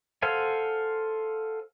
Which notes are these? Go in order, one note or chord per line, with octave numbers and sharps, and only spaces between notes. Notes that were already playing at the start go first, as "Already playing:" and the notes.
A4 C5 F5 F#5 G#5